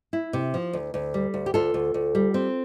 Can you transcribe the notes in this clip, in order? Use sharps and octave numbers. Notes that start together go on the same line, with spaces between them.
E4
C3
F3
D2
D2
G3
D2
G4
D2 F4 A4
D2
D2
G3
C4